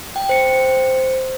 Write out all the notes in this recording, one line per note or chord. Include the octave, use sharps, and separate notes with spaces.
G5
C5 C#7